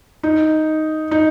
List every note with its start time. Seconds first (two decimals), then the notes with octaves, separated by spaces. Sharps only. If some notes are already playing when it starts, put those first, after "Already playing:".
0.23 D#4
1.11 D#4